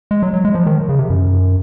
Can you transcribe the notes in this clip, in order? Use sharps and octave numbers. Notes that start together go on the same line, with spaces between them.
G#3
F#3
F#3
G#3
F3
D#3
C#3
C3
F#2